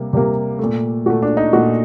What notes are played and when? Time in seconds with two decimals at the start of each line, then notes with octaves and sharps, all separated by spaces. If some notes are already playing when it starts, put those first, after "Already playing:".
Already playing: C3 G3 A#3
0.13 C3 G3 A#3
0.59 A#2 A3
1.06 A#2 A3 F#4
1.22 D4
1.37 D#4
1.53 A#2 A3 F#4